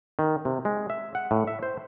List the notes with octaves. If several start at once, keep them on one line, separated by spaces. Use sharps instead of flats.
D#3
C3
G#3
E5
F#5
A2
E5
C5